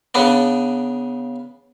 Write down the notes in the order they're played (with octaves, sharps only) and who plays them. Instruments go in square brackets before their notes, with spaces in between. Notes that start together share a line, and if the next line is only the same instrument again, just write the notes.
[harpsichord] C#3 B3 D4